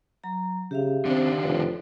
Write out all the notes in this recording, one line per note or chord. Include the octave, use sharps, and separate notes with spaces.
F#3 A#5
C#3 G4 E5 F5
D3 D#3 C4 D4
F1 B4